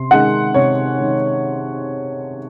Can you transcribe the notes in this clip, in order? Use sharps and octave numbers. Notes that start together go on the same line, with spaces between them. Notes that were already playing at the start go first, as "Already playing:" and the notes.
Already playing: C3 C6
D#3 G#3 F#5
C3 C#5
D#3 G#3